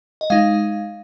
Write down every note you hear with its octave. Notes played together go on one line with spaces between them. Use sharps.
D#5
G#3 D#4 F5